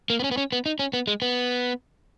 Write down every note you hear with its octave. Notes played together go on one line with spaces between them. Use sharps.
A#3
B3
C#4
B3
C#4
B3
D#4
C#4
B3
G#3
B3